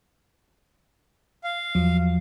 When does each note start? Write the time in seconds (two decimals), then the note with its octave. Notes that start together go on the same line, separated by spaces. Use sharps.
1.44 F5
1.75 E2 F3 F#3